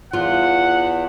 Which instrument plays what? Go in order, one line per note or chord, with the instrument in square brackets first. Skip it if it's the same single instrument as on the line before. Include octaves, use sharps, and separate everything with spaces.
[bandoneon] E2 [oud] F4 [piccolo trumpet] F#5